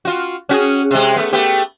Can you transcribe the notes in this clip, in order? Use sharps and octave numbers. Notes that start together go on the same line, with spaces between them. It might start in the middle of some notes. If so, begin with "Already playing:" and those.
F4 F#4
C#4 F#4 G#4
C3 G#3
A3 B3
A3 B3 G4